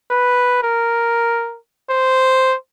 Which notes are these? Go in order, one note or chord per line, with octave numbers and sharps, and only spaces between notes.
B4
A#4
C5